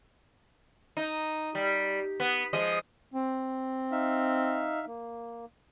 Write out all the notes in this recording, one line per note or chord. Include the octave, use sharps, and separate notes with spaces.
D#4
G3
B3
F3 G#3 D#5
C4
D#4 E5 F5
A#3